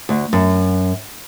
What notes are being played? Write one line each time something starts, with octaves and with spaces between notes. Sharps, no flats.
D2
F#2